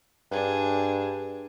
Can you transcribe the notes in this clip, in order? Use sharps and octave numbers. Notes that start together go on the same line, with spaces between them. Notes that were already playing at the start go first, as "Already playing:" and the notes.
G2 D4 G#4